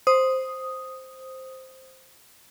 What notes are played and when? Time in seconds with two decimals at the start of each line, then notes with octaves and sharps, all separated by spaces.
0.07 C5 D#6